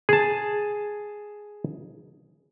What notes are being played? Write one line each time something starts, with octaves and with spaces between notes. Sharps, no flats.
G#4 A5